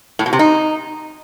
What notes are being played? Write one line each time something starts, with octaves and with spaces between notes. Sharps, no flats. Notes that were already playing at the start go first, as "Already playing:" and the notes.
A2
B2
C3
D#4